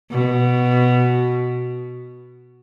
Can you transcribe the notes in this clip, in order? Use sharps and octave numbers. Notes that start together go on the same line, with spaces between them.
B2